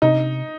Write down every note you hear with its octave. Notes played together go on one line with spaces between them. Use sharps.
C3 D#4